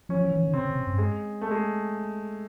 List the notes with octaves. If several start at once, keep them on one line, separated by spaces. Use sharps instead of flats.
F3 C#4
F3
E3
D#3
C#3 C4
C#3
C3
G2
G#3
A3
G#3